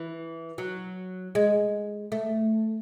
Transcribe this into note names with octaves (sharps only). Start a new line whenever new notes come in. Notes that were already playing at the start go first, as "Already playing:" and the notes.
Already playing: E3
F#3
G#3
A3